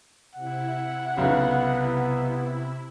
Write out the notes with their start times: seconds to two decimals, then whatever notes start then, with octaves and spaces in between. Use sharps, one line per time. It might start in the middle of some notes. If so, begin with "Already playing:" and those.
0.35 C3 E4 F#5
1.17 B1 C#3 B3